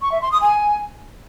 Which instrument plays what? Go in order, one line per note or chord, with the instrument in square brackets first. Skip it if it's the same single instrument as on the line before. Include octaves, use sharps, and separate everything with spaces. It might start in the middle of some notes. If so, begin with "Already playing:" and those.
[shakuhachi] C#6
E5
C6
D#6
G#5